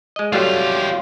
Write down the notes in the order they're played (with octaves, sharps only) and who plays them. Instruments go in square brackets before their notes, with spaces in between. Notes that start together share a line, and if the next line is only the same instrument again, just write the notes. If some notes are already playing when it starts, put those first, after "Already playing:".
[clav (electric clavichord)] G#3 D#5
[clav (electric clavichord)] F#3 G3 A3 [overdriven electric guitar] F4 G4